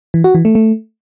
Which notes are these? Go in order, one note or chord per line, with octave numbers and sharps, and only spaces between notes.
E3
F#4
E3
A3
A3